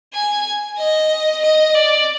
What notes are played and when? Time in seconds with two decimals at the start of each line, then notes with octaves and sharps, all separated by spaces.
0.13 G#5
0.78 D#5
1.42 D#5
1.74 D5